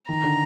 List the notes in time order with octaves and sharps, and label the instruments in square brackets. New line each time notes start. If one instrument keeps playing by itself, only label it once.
[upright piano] D#3 [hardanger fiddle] A#5
[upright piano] D3